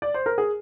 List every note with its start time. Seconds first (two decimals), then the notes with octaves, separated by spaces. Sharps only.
0.02 D5
0.14 C5
0.26 A#4
0.38 G#4